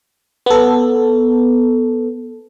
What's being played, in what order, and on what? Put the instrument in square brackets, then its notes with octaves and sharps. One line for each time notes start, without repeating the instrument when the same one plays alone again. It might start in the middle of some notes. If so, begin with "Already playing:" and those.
[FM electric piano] B3 A4